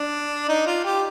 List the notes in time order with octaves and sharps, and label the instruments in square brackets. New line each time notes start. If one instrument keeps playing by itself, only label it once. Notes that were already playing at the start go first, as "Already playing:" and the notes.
Already playing: [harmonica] D4
D#4
F4
G4